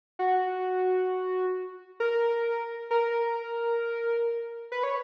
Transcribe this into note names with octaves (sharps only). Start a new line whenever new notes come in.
F#4
A#4
A#4
B4
C#5